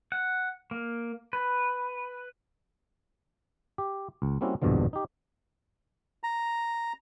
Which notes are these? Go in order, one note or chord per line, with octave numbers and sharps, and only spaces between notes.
F#5
A#3
B4
G4
C#2
G3 A#3 C4 C#4 E4 F#4
A#1 E2 G2 B2 D3 F3
D#4 G4
A#5